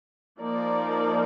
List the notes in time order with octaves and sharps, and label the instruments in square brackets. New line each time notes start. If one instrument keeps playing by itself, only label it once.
[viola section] F3 A#3 D#4 A#4 D5